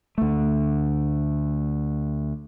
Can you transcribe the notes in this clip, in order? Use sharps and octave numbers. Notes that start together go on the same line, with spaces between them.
D2 A3